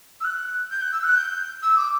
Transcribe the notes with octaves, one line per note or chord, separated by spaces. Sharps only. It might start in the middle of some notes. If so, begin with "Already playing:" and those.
E6
F#6
G6
F#6
E6
F#6
G6
E6
D6